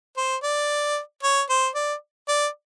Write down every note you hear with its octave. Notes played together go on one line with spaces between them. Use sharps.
C5
D5
C#5
C5
D5
D5